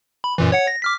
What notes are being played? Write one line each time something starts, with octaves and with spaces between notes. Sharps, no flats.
B5
F#2 A#2 E3
C#5 F#5 C#7
A#6
D6 F6 B6